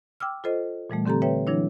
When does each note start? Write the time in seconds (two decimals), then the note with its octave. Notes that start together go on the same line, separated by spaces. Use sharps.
0.20 G5 D6 E6 F6
0.44 F4 A4 C5 D#5
0.90 A#2 E3 G3 A3
1.06 D3 C4 G4 A4 A#5
1.22 B4 C#5 E5 G5
1.47 E3 F#3 D4 E4 C#5